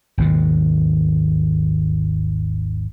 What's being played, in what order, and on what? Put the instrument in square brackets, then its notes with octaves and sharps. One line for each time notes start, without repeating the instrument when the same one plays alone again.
[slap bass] G#1 D#2 B2